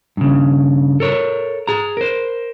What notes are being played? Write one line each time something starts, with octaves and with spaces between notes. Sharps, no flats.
G2 C#3
A4 A#4 C#5
G#4 A#5
A#4 C5